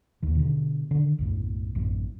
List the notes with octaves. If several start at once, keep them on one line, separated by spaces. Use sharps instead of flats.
D#2 D#3
B2 D3
D3 D#3
B1 F#2 A2
A1 F#2